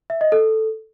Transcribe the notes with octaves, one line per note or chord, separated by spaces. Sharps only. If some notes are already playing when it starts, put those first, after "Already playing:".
E5
D#5
A4